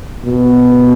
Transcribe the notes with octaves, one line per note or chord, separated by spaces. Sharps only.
B2